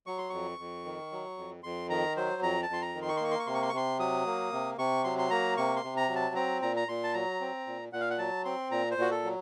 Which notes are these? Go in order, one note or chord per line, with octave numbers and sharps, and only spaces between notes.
F#3 C#6
C6
F2 C#6
F2
D#3
F#3
F2
F2 C6
D#3 A#5
F#3 C5
F2 A#5
A5
F2 C6
A#5
D#3
C6
C#6
C6
A#3 C#6
C6
C#6
C3 C6
C#6
C6
C#6
C3 C6
F#3 D#6
A#3
C3
C3 C#6
F#3 C6
C6
A#3 A#5
C3 C#6
C6
C3
A#5
F#3
A5
C4 A#5
A#2 A#5
A#5
A#2 C6
A5
F#3 A#5
C4
A#2
A#2 F#5
F5
F#5
F#3 A5
C4 C6
A#2 A#5
C5
A#2 F#4
A4
F#3